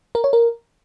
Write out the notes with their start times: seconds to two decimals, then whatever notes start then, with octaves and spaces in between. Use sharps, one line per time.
0.15 A#4
0.24 C#5
0.33 A#4